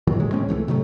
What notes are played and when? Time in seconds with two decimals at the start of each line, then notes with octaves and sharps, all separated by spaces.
0.07 A#2 D#3 E3 F#3
0.20 D1 D2 G#3
0.31 A2 G#3 C4 C#4
0.49 C2 E3 G#3 A3
0.68 C3 D#3 F#3 A3